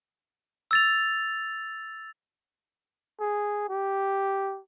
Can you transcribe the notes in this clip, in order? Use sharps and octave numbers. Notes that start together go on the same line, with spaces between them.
E6 A6 F7
G#4
G4